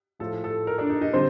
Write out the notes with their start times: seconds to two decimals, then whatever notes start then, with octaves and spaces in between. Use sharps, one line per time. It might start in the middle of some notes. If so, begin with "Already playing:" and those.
0.19 A2 F3 A3 A4
0.44 A4
0.67 A#4
0.78 D4 D5
0.89 D#4 D#5
1.01 D#4 D#5
1.13 D3 G3 C4 C5